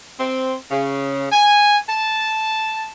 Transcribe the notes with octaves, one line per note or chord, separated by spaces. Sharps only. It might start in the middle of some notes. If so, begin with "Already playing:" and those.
C4
C#3
G#5
A5